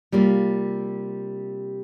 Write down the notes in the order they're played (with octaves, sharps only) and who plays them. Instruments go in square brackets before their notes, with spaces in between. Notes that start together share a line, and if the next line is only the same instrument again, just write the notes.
[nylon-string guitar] C3 G3 A#3 F4